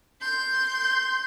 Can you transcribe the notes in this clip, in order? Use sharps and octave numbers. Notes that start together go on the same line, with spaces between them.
C6 G6